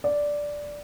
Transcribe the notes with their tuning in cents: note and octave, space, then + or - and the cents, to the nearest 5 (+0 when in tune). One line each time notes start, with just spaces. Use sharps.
D5 -5